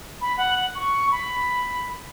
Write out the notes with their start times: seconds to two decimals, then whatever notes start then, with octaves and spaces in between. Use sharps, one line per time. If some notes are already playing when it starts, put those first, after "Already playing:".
0.21 B5
0.38 F#5
0.75 C#6
1.12 B5